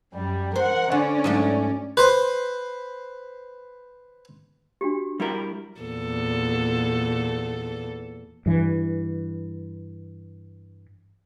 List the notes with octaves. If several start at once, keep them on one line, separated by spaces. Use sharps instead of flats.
F#2 G3
A#4 C5 F#5
D3 C#4 D5
G#2 F#3 A3
B4 C5
D4 F#4 G4
G3 E4 A#4
E2 A#2 A4
G2 E3